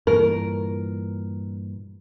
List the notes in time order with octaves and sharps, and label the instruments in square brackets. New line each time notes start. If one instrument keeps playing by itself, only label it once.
[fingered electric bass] G2 A#2 E3 [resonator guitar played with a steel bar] A#4